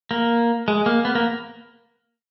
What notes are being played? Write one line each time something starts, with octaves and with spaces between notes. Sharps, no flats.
A#3
G#3
A#3
B3
A#3